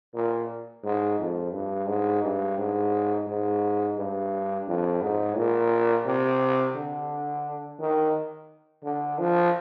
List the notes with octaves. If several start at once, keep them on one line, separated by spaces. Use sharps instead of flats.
A#2
G#2
F2
G2
G#2
G2
G#2
G#2
G2
F2
G#2
A#2
C3
D3
D#3
D3
F3